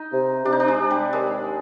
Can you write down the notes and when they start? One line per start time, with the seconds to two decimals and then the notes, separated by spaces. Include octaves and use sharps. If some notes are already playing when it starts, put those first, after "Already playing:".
Already playing: D#4
0.12 C3
0.45 C3 D4
0.52 D#4
0.60 D4
0.68 G#3
0.79 C3
0.90 G3
1.13 D#2 G#3